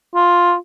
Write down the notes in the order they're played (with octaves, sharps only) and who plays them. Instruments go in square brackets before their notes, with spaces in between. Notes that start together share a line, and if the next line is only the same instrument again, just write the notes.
[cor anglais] F4